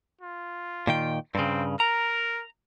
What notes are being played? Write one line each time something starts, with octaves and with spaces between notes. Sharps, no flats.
F4
A#2 D#3 G5
G2 C#3 C4
A#4 A#5